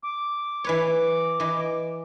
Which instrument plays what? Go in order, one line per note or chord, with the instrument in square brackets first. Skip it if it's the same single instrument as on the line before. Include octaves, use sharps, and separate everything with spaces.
[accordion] D6
[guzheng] E3 B4 C#5
E3 D#5